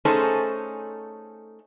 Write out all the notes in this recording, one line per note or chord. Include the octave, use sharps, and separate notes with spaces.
A3 C#4 D#4 G#4 A4 C5